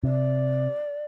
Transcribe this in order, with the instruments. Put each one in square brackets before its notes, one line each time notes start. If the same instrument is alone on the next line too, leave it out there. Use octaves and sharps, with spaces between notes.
[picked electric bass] C3 [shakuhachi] D5